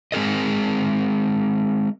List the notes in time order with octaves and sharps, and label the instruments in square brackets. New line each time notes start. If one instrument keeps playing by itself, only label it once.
[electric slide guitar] G#3 C4 G#4 A#4 D#5